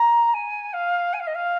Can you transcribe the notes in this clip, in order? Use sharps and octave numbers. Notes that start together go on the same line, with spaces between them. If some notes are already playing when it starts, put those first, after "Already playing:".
Already playing: A#5
G#5
F5
G#5
F5
D#5
F5